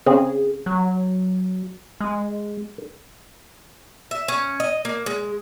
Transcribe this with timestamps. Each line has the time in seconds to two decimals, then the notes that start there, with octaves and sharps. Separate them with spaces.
0.06 C#3 C4 G#4
0.66 F#3
2.00 G#3
4.11 E5
4.28 C#4
4.60 D#5
4.85 A#3
5.06 G#3